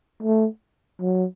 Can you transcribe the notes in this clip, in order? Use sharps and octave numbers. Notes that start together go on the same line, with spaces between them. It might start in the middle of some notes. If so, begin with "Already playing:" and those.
A3
F#3